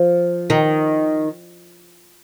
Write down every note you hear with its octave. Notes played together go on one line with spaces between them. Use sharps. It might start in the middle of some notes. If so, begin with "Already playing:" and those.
Already playing: F3
D#3